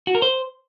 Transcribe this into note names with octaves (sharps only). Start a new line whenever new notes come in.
F#4
A#4
C5